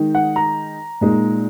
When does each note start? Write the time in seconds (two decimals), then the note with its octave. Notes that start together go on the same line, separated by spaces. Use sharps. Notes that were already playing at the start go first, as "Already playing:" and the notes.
Already playing: D#3 G#3 D#4
0.15 F#5
0.36 A#5
1.01 A#2 G#3 D#4